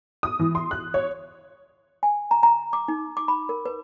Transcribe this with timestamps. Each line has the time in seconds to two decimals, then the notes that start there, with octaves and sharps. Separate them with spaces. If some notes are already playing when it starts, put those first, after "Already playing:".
0.23 D#6
0.39 E3
0.55 C6
0.71 F#6
0.94 C#5
2.03 G#5
2.31 A#5
2.43 A#5
2.73 D6
2.88 D#4
3.17 D6
3.28 B5
3.49 A#4
3.66 B4